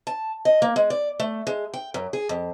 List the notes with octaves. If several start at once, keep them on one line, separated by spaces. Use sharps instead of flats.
A5
D#5
A#3
G#3
D5
A3
G#3
G5
F#2
G#4
F2